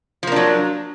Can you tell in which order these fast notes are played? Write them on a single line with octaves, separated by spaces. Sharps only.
F3 A#3 D4 F#3